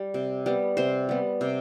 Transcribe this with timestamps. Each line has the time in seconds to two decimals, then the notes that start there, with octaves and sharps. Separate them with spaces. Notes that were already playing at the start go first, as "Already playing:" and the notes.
Already playing: G3
0.14 C3
0.46 G3 B3
0.77 C3 C5
1.09 G3 B3
1.41 C3